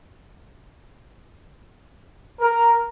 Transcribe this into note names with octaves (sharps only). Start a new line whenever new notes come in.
A#4